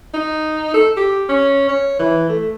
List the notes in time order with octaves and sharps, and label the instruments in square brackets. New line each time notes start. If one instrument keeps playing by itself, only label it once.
[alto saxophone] D#4
A4
G4
C#4
C#5
E3
A3